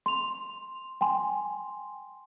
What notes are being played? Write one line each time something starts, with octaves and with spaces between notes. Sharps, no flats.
C6 F7
G5 G#5 C6